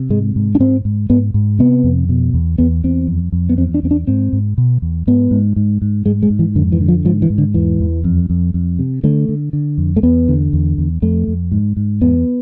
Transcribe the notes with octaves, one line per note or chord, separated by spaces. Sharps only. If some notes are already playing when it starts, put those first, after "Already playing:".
Already playing: C3
G#2 G#3
G#2
D4
G#2 C4
G#2
G#2 B3
G#2
C3 B3
F2
B2
E2
E2 B3
E2 C4
F2
F2
B3
E2 C4
D4
E2 C4
D4
G#2 C4
G#2
B2
E2
G#2 B3
G#2
G#2
G#2
G#2 G#3
G#3
G#2
E3
F2 D3
E3
D3
F3
G#2 F3
E3
G#2
D3
E2 E3
E2
F2
F2
F2
C3
D3 A3
D3
D3
F2
A3
E2 B3
D3
E2
E2
F2 A3
F2
G#2
G#2
E2 B3